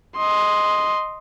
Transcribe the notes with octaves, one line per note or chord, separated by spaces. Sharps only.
D#5 C6